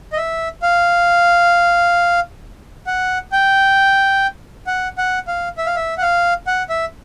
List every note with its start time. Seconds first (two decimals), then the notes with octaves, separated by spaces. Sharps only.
0.13 D#5
0.17 E5
0.62 F5
2.87 F#5
3.32 G5
4.67 F#5
4.98 F#5
5.28 F5
5.58 E5
5.66 F5
5.76 E5
5.98 F#5
6.02 F5
6.47 F#5
6.69 E5